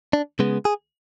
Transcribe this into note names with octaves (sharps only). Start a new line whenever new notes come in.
D4
C#3 G#3 B3
G#4